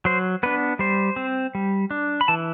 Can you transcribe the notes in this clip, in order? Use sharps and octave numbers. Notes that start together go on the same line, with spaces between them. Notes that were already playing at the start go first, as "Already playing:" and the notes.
F#3 C5
B3 D4 B4
G3 C5
C4
G3
D4
B5
E3 A5